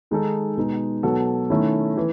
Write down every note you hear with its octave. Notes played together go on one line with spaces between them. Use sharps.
D#3 G#3 D#4 A4
B2 G#3 D#4
B2 F#3 B3 F#4 A4
D#3 A3 C#4 E4
E3